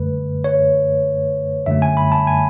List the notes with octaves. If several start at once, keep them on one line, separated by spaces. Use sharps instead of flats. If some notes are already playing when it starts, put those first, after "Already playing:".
Already playing: F#2 D3 A3 B4
C#5
F#2 D3 A3 E5
G#5
B5
A5
G#5